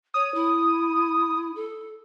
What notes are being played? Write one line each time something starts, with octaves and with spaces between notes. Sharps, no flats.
C#5 D#6
E4
A4